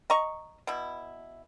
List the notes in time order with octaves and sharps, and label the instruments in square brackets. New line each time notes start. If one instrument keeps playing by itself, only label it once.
[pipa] D#5 A#5 C#6
B2 E4